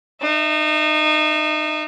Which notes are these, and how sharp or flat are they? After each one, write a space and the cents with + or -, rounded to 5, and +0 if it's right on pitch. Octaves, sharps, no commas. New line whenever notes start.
D#4 -30 E5 +0